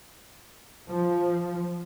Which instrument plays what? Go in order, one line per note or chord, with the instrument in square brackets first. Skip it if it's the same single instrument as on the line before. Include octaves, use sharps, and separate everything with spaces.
[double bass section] F3